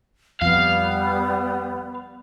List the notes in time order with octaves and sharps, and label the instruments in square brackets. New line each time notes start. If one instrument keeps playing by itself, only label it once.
[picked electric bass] F2 F3 [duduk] G3 [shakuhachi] B3 [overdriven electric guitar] F5